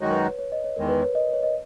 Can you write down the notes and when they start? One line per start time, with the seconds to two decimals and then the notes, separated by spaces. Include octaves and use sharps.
0.01 F#2 D#3 G#3 D#4 F#4 C#5
0.11 B4
0.22 C#5
0.39 C#5
0.52 D#5
0.64 C#5
0.76 E2 D#3 G#3 A#4
0.89 B4
1.02 C#5
1.15 D#5
1.33 C#5
1.43 D#5